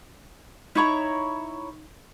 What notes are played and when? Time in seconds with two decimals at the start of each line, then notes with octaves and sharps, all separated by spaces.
0.75 D#4 E4 C#5 A#5 B5